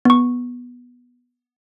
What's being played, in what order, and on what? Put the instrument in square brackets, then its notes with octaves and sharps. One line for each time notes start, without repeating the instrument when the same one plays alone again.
[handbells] B3 C#6